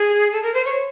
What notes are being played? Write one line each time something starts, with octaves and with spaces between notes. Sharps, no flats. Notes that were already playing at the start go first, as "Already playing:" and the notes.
Already playing: G#4
A4
A#4
C5
C#5